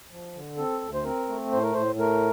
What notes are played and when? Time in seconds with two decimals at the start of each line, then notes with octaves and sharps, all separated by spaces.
0.11 F3
0.34 D3
0.57 C4 A4
0.82 D2
0.94 C5
1.04 C4 A#4
1.28 A3
1.52 A2 C5
1.63 A#4
1.74 A2 C5
1.99 A3 A#4